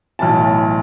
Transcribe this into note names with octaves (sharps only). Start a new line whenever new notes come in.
B1 A2 E3 A5